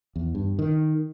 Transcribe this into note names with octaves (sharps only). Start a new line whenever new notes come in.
E2
G2
D#3